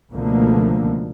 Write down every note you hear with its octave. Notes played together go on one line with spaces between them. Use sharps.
C#2 B2 D3 F3 A3 A#3